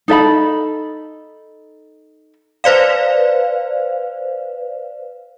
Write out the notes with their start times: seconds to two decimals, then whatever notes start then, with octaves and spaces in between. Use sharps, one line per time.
0.08 D#4 A4 E5 B5
2.64 B4 C5 D5 F5